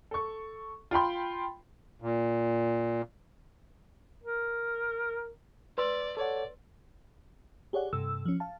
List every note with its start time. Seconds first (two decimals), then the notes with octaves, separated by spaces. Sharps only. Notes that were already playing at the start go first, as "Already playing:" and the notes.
0.11 A4 C#6
0.91 F4 G5 B5 C6
2.02 A#2
4.23 A#4
5.78 B4 D5 C6 E6
6.17 A4 C#5 D5 F#5
7.73 G4 G#4 C#5 D5 F#5
7.93 G2 C3 A4 E6
8.25 F3 C#4
8.40 F5 A5